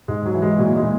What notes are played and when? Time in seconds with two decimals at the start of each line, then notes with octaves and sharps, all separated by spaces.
0.08 G#2 G#3
0.25 F#3
0.34 E3
0.42 G#3
0.58 A#2 F#3
0.76 G#3
0.83 A#2